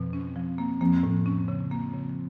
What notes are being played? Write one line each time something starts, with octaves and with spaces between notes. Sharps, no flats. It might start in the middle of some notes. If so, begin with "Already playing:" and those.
Already playing: F2 B2
C#4
F3
A#3
F2 A#3
F2 A2
C#4
C#3
A#3
C#3